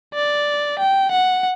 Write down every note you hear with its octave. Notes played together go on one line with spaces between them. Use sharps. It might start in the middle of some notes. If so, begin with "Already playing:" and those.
D5
G5
F#5